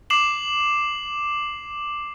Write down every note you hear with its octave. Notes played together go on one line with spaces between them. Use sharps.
D6 C7 E7 F#7